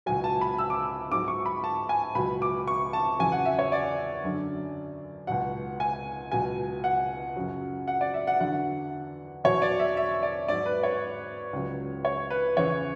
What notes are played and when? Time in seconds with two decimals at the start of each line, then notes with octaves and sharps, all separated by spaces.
0.06 C#2 B2 F#3 G#5
0.24 A5
0.41 B5
0.59 E6
0.70 D6
0.82 E6
1.11 G#2 F#3 D6
1.28 C#6
1.46 B5
1.64 A5
1.89 G#5
2.15 C#2 B2 F#3 B5
2.42 D6
2.67 C#6
2.93 A5
3.19 E2 C#3 F#3 G#5
3.32 F#5
3.45 E5
3.59 C#5
3.72 D5
4.24 F#2 D3 F#3
5.27 C#2 B2 F#3 F#5
5.80 G#5
6.31 C#2 B2 F#3 G#5
6.84 F#5
7.36 F#2 C#3 F#3
7.88 F#5
8.01 D5
8.14 E5
8.27 F#5
8.40 E2 D3 F#3 F#5
9.44 E2 B2 F#3 C#5
9.62 D5
9.80 E5
9.97 E5
10.23 D5
10.48 G#2 F#3 D5
10.66 B4
10.83 C#5
11.53 C#2 C#3 F#3
12.05 C#5
12.30 B4
12.57 E2 C#3 E3 C#5